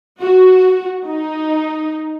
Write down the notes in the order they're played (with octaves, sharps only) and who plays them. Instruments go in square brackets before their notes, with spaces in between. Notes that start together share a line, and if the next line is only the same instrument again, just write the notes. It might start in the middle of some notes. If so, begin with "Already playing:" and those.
[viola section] F#4
D#4